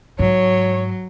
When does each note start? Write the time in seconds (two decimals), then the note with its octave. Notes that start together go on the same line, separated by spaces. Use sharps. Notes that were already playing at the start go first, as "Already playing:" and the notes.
0.19 G#2 F#3 C#5